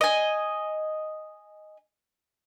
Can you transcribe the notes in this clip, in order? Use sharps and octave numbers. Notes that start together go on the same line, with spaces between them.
D#5 G#5